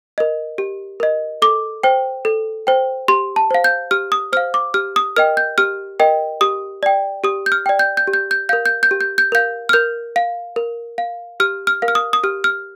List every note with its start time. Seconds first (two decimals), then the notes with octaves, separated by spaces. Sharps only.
0.18 A#4 D#5
0.58 G4
1.00 A#4 D#5
1.42 A4 D6
1.83 C5 G5
2.25 A4
2.67 C5 G5
3.08 G4 C6
3.36 A5
3.51 C5 F5
3.64 G6
3.91 G4 F6
4.12 D#6
4.33 C5 F5 F6
4.54 D6
4.74 G4 F6
4.96 D#6
5.16 A#4 D#5 G5 F6
5.37 G6
5.58 G4 F6
6.00 A#4 D#5 G5
6.41 G4 D#6
6.83 D5 G5
7.24 G4 D#6
7.46 G6
7.52 F6
7.66 D5 G5
7.79 G6
7.97 G6
8.07 G4
8.13 G6
8.31 G6
8.49 A#4 F5 G6
8.66 G6
8.83 G6
8.91 G4
9.01 G6
9.18 G6
9.32 A#4 F5 G6
9.69 F6
9.73 A#4 G6
10.16 F5
10.56 A#4
10.98 F5
11.40 G4 F6
11.67 F6
11.82 A#4 F5
11.88 F6
11.95 D#6
12.13 D#6
12.24 G4 F6
12.44 F6